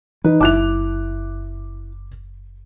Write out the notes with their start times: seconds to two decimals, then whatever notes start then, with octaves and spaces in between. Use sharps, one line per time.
0.24 E3 D#4 B4
0.41 F#1 E4 A5 D6 F#6 F7